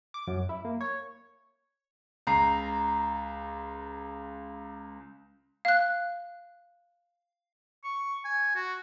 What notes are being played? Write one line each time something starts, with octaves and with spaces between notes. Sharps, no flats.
D6
F#2
E4
A#3
C#5
C#2 A#5 C7
F5 F#6
C#6
G#5
F#4